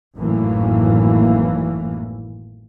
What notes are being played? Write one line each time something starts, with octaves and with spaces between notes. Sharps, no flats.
G#1 F#2 A2 E3 A#3